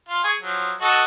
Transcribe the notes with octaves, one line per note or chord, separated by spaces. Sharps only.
F4
G#4 G#5 C#6
F3 F#3
F#4 A4 D#5